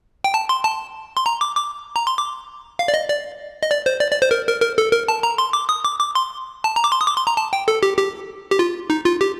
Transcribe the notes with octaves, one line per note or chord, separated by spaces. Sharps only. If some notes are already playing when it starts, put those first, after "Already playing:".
G5
A5
C6
A5
C6
A#5
D6
D6
A#5
C6
D6
F5
D5
D#5
D5
D#5
D5
C5
D5
D5
C5
A#4
A#4
A#4
A4
A#4
A5
A#5
C6
D6
D#6
D6
D6
C6
A5
A#5
D6
C6
D#6
D6
C6
A#5
A5
G5
A4
G4
G4
G4
F4
D#4
F4
G4